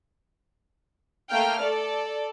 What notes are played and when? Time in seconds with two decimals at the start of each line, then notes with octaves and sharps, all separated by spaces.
1.31 A3 A#3 G5 F6
1.61 A4 D5